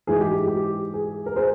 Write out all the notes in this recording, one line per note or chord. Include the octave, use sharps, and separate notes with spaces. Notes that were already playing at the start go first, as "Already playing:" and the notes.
G#2 E3 G#4
G4
G4
G#4
A#4
G#4 C5